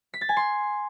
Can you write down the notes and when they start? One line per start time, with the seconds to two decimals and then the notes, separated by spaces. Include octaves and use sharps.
0.14 B6
0.21 A6
0.29 G#5
0.37 C6